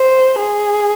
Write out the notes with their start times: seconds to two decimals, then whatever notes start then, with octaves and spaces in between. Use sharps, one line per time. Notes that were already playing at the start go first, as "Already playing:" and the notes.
Already playing: C5
0.39 G#4